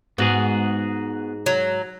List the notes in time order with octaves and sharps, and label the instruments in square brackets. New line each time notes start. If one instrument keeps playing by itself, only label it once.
[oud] G#2 [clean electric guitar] B3 F#4 G#4
[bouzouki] F#3